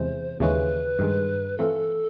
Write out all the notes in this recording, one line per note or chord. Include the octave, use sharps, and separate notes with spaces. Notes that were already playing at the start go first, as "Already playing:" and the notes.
Already playing: E2 C3 E3 G#3 C4 C5
D#2 C#3 E3 G#3 C#4 B4
G2 D#3 G#3
E3 A3 C4 F4 A4